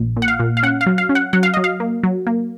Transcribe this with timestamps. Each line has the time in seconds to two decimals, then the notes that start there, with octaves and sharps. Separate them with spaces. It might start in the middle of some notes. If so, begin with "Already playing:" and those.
Already playing: A#1
0.16 A#2
0.22 F#5
0.28 F5
0.40 A#2
0.57 F5
0.63 C#4 F#5
0.81 F5
0.86 F#3
0.98 F5
1.09 C#4
1.15 F#5
1.33 F#3 F#5
1.43 F5
1.54 F#3 D#5
1.64 F5
1.80 A#3
2.03 F#3
2.27 A#3